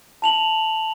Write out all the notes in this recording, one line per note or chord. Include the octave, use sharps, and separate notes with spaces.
A5 F7 F#7